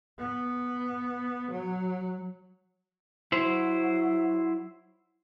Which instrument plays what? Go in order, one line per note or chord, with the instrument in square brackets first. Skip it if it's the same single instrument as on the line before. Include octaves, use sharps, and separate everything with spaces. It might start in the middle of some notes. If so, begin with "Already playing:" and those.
[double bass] B3
F#3
[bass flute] F#3 [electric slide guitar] E4 C5